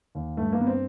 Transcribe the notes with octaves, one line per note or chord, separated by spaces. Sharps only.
D#2
G2 A3
A#3
G2 B3
C4